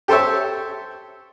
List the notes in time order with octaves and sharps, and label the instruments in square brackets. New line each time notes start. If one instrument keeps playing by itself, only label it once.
[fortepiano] G4 A4 C5 C#5 E5